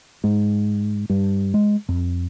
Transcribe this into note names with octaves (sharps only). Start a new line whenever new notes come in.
G#2
G2
G#3
F2